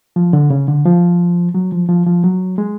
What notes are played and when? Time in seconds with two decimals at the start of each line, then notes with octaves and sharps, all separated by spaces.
0.16 F3
0.33 D3
0.50 C#3
0.68 D3
0.85 F3
1.54 F#3
1.72 F3
1.89 F3
2.06 F3
2.24 F#3
2.58 G#3